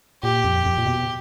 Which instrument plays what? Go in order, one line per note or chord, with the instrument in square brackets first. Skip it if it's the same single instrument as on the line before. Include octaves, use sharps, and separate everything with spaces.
[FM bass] A#2 [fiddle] G4
[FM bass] F2
F2
A#2
B2